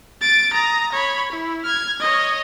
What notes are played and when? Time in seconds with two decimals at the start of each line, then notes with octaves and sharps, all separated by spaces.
0.22 A6 D7
0.53 A#5 D#6
0.93 C#5 B5
1.32 E4
1.64 F6 G#6
2.00 C#5 D#5